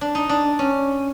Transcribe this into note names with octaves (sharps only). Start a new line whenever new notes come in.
D4
D#4
D4
C#4